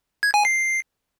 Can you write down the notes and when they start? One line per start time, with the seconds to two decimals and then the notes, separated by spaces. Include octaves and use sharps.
0.23 G#6
0.34 G#5
0.45 C7